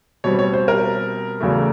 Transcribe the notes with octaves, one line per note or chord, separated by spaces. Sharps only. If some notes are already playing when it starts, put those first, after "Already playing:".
B2 G3 C4 C#5
C#5
C5
A#4
E2 C#3 F#3 A3